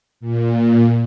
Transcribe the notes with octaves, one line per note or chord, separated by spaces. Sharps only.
A#2